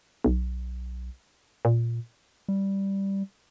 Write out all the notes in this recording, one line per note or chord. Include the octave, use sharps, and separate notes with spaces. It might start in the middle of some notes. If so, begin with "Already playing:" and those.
B1
A#2
G3